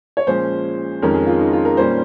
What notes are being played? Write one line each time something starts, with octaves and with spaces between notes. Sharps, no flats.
C#5
A#2 F3 G#3 C#4 C5
F2 D#3 G#3 C#4 A#4
G#4
F4
D#4
F4
A#4
A#2 G3 A#3 C#4 C5